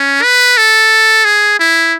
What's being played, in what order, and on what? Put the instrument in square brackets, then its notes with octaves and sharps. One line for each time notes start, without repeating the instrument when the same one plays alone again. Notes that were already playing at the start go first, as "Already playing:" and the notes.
Already playing: [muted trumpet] C#4
B4
A4
G#4
E4